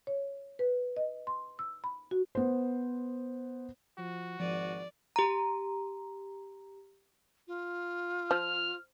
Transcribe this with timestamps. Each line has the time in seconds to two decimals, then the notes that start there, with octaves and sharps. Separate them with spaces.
0.07 C#5
0.59 B4
0.97 D#5
1.27 C6
1.59 E6
1.84 B5
2.11 F#4
2.35 B3 C5
3.98 F3 F#4
4.40 G#1 F3 D5 D#7
5.16 G4 A#5
7.47 F4
8.31 F3 F6